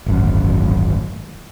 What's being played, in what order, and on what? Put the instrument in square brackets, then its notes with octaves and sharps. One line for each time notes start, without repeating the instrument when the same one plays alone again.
[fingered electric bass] D1 G#1 F#2